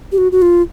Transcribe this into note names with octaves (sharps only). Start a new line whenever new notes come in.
G4
F#4
F#4
F4